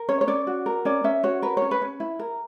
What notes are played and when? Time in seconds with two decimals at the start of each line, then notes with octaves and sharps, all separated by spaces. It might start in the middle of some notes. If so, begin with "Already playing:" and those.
Already playing: A#4
0.09 C#4 C#5
0.21 C#5
0.27 C#4 D5
0.47 F#4
0.66 A#4
0.85 C#4 D5
1.04 C#4 E5
1.23 F#4 C#5
1.42 A#4 B4
1.57 C#4 C#5
1.71 B4
1.82 C#4
2.00 E4
2.19 A#4